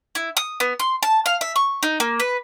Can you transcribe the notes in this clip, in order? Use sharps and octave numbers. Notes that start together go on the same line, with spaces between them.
E4
D#6
B3
C6
A5
F5
E5
C#6
D#4
A#3
B4